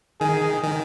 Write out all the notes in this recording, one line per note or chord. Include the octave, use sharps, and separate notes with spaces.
D#3 G#4
D#3